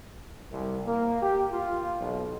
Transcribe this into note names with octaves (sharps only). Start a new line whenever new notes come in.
C2
A#3
G4
F4
B1